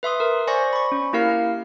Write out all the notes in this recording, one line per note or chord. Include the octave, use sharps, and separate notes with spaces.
B4 E5 C6 D#6
A#4
C5 D5 G#5 C#6 A#6
B5 C#6
C#4
A#3 E4 G4 A#4 F5 F6